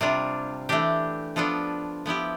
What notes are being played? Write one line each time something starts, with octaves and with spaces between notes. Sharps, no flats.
C3 G3 D4 F4
E3 A3 D4 G4
F3 B3 D4 F4 A4
F3 B3 E4 G4